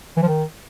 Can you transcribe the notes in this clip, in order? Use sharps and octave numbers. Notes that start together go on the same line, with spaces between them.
E3
F3
D#3